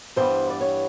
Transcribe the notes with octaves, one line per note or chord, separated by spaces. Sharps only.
G2 E3 G3 B3 C5
D5
C#5